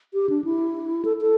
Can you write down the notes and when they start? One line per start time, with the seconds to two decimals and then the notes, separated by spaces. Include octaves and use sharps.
0.14 G4
0.29 D4
0.44 E4
1.05 A4
1.21 A4